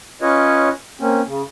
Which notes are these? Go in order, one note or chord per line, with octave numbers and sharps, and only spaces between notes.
C#4 F4 B4 C#5 D#5
A#3 C4 C#4
C#3